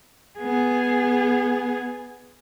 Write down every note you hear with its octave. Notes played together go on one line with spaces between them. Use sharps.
B3 G#4